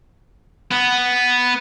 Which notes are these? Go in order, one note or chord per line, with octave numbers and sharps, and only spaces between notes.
B3